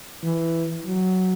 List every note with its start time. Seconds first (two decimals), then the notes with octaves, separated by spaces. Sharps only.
0.23 E3
0.86 F#3